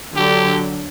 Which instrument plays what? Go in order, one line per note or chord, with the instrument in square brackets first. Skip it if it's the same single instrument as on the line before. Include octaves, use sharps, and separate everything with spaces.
[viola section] D3 F#3 [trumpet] G4